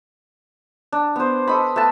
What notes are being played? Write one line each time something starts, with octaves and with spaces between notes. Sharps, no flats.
D4
B3 C5
A4 D#5 B5
A3 B4 A5